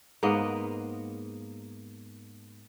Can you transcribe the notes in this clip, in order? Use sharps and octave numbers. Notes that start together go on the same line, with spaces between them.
G#2 A#3 B3 D#5